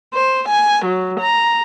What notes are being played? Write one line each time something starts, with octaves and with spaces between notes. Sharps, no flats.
C5
G#5
F#3
A#5